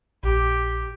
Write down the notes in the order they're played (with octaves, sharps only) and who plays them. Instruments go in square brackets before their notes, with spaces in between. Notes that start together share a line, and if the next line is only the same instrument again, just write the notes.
[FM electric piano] A#1 [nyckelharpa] G4